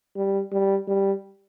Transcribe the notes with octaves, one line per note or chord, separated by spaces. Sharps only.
G3
G3
G3